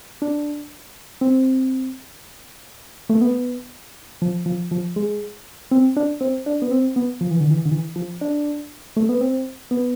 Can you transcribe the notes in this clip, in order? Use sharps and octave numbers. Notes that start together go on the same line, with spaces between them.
D4
C4
A3
B3
F3
F3
F3
G#3
C4
D4
C4
D4
B3
C4
B3
F3
E3
D3
E3
D3
E3
F3
D4
A3
B3
C4
B3